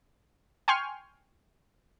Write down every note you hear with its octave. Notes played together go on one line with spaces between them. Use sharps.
G5 G#5 C6 C#6 F6